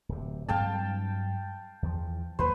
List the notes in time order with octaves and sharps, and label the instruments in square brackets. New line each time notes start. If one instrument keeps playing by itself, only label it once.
[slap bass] D1 C3
[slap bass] G2 F#3 C4 [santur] F5 G5 A5
[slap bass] E2 E3 F3
[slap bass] D#2 F#3 A#3 [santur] B4 C5